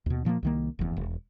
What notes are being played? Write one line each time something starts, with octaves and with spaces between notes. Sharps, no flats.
D#2 B2
A#2 F3 G#3 A#3
C2 D#3 A#3
F1 E2
E1